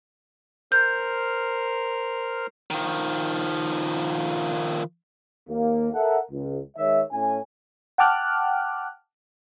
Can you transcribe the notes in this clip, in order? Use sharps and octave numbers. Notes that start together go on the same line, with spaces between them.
A#4 C5 F6 G6
D#3 F3
D#2 A#3
A4 A#4 E5 F#5
C#2
D#3 G#3 C#5 E5
A2 C#4 G#5
F#5 G5 A5 D6 F6 F#6